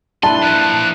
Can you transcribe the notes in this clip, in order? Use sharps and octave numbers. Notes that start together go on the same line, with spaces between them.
D4 E4 B4 A5 C6
A#2 F3 F#6